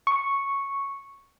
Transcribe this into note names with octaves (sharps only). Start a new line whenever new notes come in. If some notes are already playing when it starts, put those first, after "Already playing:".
C#6